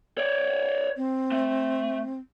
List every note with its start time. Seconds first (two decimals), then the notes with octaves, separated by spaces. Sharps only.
0.18 C#5 D5
0.97 C4
1.32 A3